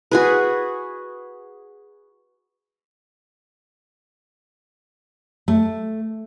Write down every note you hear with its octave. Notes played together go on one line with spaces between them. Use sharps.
F#4 G#4 B4
A3